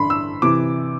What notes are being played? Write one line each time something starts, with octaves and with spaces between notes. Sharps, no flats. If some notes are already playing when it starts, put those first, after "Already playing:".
Already playing: A1 G2 D3 B5 C6
E6
C3 E3 D6